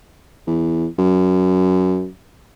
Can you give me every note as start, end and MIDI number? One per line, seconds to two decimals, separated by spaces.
0.47 0.87 40
0.98 2.08 42